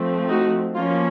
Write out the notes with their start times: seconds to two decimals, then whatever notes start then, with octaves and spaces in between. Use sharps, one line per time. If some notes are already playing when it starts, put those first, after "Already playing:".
Already playing: F3 A3 C4
0.29 D#4 F#4
0.75 F3 A#3 C#4 F4